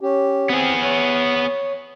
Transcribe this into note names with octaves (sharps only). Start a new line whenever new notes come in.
C#4 G4
B3 C4 G#4
C#5